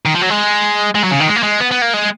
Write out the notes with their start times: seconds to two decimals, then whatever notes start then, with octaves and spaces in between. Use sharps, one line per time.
0.05 D#3
0.14 F3
0.21 F#3
0.30 G#3
0.95 G#3
1.04 F#3
1.11 C#3
1.20 D#3
1.27 G#3
1.36 A#3
1.43 G#3
1.60 B3
1.71 B3
1.82 A#3
1.94 G#3